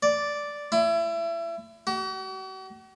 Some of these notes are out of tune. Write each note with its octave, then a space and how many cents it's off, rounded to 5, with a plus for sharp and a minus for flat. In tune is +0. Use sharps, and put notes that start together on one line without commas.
D5 -5
E4 +30
F#4 +45